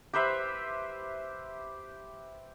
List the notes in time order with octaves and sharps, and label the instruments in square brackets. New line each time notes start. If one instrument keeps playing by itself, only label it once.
[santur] G4 B4 C5 E5